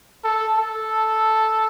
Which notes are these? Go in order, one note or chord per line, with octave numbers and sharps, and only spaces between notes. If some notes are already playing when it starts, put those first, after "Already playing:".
A4
A4